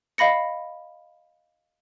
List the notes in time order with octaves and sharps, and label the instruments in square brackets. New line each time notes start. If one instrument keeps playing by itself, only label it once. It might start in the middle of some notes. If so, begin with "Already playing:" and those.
[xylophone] D#5 F5 B5 A#6 C#7